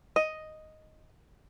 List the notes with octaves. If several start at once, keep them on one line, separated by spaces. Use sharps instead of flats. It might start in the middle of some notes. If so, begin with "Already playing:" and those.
D#5